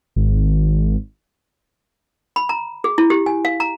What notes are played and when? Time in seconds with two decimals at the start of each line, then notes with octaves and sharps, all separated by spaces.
0.16 G#1
2.36 B5
2.49 A#5
2.84 G#4
2.98 E4
3.10 G4
3.26 G#5
3.45 F5
3.60 A#5